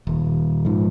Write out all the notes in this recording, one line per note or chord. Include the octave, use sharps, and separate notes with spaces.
D#1
G#2 F3